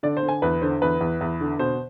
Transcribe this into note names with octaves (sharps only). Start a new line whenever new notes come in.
D3 D5
C5
D3
G#5
E2 B4
D3 C5
E2 B4
E2
E2
D3
B2 C5